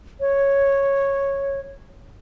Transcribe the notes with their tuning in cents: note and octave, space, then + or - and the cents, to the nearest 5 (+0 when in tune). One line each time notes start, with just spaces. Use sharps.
C#5 -5